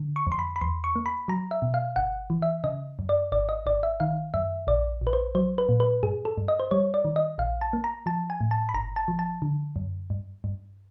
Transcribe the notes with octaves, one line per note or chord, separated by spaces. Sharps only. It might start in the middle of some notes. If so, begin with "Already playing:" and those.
Already playing: D3
C#6
F2
C6
B5
B5
E2 C6
C#6
A#3
B5
F#3 A#5
E5
B2
F5
G1 F#5
E3
E5
C#3 D#5
F#2
D5
G#1 D5
D#5
G#1 D5
E5
D#3 F5
F#2 E5
A#1 D5
A#1
B4
C5
F#3 C5
B4
A#2
B4
G2 G#4
A4
G2
D#5
C5
G3 C#5
D5
D#3
D#5
A#1 F5
A5
A#3
A#5
F3 A5
G#5
A2
A5
B5
G1 A#5
A5
F3
A5
D3
F#2
G2
G2